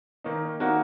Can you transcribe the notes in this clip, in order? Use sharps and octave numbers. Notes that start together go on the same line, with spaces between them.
D#3 A#3 D#4
D#3 A#3 D#4 F#4